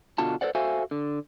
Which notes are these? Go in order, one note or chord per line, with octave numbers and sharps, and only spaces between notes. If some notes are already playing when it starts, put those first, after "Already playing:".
B2 D3 F4 F#4 A5
A4 B4 C5 D5 F#5
F#4 A4 C5 E5 F5 G#5
D3